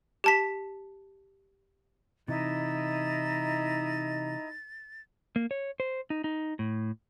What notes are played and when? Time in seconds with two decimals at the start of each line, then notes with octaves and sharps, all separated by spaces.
0.24 G4 A5 B6
2.28 C3 E3 D#4 E4 D#5 A#5 A6
5.36 A#3
5.51 C#5
5.80 C5
6.10 D#4
6.24 D#4
6.59 A2